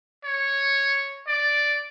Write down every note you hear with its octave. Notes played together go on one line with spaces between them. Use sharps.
C#5
D5